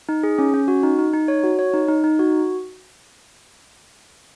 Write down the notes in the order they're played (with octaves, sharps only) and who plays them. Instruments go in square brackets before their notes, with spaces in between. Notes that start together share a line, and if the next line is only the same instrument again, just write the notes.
[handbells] D#4
G#4
C#4
C#4
F#4
D#4
D#4
D#4
C#5
F#4
C#5
D#4
D#4
D#4
F#4